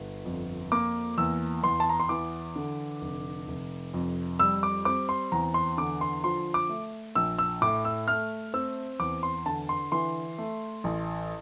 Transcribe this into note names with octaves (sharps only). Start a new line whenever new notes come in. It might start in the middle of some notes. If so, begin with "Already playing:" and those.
Already playing: G1
F2
A#3 D6
E2 E6
E2 C6
A5
A#5
C6
E3 D6
D3
F1
F1
F2
G3 E6
D6
C4 D6
C6
E2 A#5
C6
D3 D6
C6
F3 C6
D6
A3
A#1 E6
E6
A2 D6
E6
A3 F6
C4 E6
E2 D6
C6
D3 A5
C6
E3 C6
A3
A1